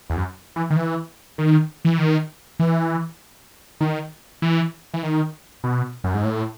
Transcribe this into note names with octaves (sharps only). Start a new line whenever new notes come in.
E2
F#2
E3
D#3
E3
D#3
E3
D#3
E3
D#3
E3
E3
D#3
B2
F#2
G#2
A2